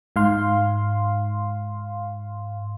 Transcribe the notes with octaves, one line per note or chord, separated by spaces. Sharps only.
G#2 F5 C6